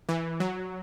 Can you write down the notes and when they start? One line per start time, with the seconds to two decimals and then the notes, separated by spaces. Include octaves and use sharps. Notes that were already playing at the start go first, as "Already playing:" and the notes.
0.09 E3
0.40 F#3